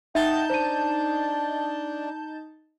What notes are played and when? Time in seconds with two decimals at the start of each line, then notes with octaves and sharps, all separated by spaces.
0.15 D#4 E5 F#5 G5 A5 G6
0.50 D4 C5 D#7